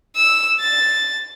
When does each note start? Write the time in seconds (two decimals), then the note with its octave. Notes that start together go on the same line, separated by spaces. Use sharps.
0.16 E6
0.60 A6